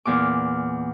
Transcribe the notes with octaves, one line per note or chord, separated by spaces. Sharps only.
E2 A#2 D6